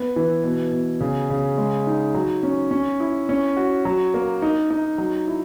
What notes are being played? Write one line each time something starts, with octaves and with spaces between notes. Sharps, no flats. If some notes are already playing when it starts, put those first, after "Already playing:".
Already playing: B3
E3
B2
B2
C#3
C#3
G#3
D#4
F#3
C#4
C#4
E4
C#4
F#4
F#3
A#3
D#4
D#4
F#3
E4